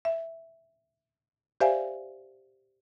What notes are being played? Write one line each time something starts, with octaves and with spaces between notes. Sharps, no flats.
E5
G4 C5 D5 E5 F5 G#5